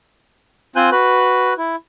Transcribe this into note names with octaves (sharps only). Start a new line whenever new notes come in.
C4 F4 C5 G#5 F#6 G6
F#4 B4 F#6
E4